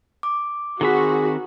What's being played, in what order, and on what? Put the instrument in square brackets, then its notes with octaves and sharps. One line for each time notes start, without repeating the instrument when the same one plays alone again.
[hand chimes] D6
[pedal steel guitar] D#3 C4 B5 [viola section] F#4 [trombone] G#4